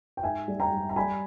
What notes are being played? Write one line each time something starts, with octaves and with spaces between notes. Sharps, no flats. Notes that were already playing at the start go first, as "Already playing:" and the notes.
G5
G#2 E5 G#5
G3
G5 A#5
G3
A#5
G3 G#5 B5